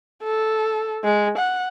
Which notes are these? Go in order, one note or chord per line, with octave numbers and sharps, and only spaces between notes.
A4
G#3
F#5